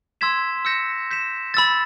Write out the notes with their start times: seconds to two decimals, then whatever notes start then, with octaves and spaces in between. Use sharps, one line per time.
0.21 C6 E6 G#6 B6 E7
0.65 E6 G6 A#6 C#7 E7
1.11 G6 B6 E7
1.54 B5 E6 A6